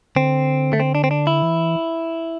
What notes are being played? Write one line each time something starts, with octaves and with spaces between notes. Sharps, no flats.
D3 C4
A3
C4
D4
C4
D4
E4
E3